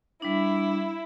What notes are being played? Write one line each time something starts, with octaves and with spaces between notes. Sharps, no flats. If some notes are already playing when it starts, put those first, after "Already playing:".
G3 D4 E4